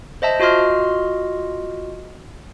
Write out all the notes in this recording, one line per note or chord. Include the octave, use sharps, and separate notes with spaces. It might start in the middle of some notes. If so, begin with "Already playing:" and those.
C5 D#5 E5 A5
F4 F#4 D#5 C6 F6